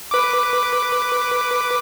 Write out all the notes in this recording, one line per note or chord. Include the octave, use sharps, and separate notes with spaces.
B4 D6